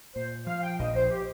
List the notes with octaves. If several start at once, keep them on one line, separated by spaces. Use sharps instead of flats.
A#2 C5
F3 F5
G5
A#1 D#5
C5
G4